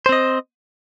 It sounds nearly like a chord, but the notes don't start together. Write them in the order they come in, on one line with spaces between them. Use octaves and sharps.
C5 C4 D#5